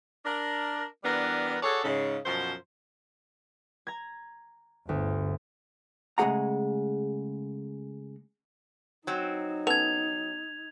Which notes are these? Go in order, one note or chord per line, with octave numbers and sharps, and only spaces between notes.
D4 A#4
E3 G3 B3 D4 A#4
F#4 G#4 A4 C#5 D5
G#2 C#3
F#2 B2 F3 C5
A#5 G#6
G1 D2
C#3 G#3 A3 G#4 F#5 A#5
F#3 C4 D#4
B3 C#4 A4 G#6 F7